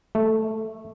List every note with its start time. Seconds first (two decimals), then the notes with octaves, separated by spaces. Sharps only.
0.15 A3